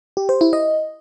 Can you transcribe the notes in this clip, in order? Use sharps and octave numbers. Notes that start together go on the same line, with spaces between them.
G4
C5
E4
D#5